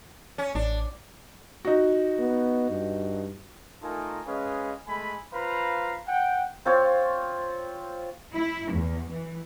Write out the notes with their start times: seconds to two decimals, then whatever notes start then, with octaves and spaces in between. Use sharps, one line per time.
0.38 C#4
0.55 A1 D4
1.65 D#4 F#4
2.19 B3
2.70 G2
3.83 A3 D#4 F4 A4 A#4 G#5
4.27 G#3 C#4 G#4 B4 D#5 F5
4.87 G#3 A3 G#5 B5
5.33 F4 B4 C5 F5 A#5 B5
6.07 F#5 G5
6.65 C4 F4 C#5
8.33 E4
8.72 E2
9.11 E3